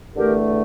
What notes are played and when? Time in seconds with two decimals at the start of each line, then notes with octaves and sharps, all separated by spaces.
0.15 E2 D3 A3 G4 A#4